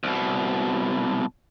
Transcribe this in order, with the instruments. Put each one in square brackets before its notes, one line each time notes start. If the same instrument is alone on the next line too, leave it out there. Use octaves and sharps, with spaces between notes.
[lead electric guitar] C2 B2